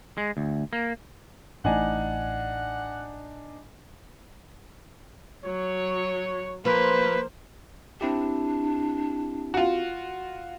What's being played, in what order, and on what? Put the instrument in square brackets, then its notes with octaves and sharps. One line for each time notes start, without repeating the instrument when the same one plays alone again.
[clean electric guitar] G#3
D2
A#3
[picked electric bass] A1 A2 [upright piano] D4 D#4 G#5 [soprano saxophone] F#5
[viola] F#3 [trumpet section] C#5
[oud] F3 [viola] A#3 C5 [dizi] B4
[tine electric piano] C4 E4 G4 [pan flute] D4
[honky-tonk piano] F4 F#4